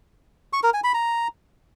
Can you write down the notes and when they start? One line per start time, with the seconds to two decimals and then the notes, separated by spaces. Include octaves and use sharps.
0.53 C#6
0.63 A#4
0.74 G#5
0.84 B5
0.94 A#5